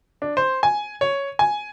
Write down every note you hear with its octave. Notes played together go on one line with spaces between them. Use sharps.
D4
C5
G#5
C#5
G#5